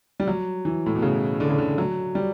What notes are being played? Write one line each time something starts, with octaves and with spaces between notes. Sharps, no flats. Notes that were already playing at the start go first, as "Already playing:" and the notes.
G3
F#3
E3
A2
B2
C#3
D3
C#3
D3
F#3
G3